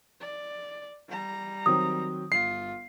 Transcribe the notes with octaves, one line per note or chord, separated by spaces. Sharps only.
D5
G3 A#5
D#3 F#3 C4 D#6
G1 F4 C7